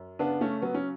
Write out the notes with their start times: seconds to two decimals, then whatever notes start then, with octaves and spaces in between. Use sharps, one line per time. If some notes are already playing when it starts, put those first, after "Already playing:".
Already playing: F#2
0.19 C#3 B3 D4
0.41 A3 C#4
0.62 F#3 B3
0.74 C#4